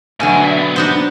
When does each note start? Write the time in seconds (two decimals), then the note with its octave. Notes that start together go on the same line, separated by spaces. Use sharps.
0.20 B2 D3 F#3 A3 G#5
0.41 D2 E5
0.57 B3
0.76 D4 D#4 C5